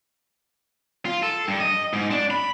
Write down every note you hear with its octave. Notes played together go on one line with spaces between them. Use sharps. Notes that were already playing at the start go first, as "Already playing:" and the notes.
F4
A4
G2
D#5
G#2
D4
B5